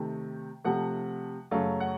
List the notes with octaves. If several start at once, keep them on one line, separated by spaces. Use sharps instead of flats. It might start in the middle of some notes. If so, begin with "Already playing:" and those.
Already playing: C3 D#3 A3
C3 F3 A3 F#5
F#2 C#3 F#3 A3 F5
F#5